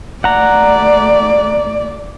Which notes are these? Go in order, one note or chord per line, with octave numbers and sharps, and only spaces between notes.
A3 D5 F#5 A#5